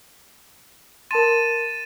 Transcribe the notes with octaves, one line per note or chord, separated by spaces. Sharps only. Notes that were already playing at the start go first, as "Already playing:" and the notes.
A#4 A5 C6 A6 D#7 E7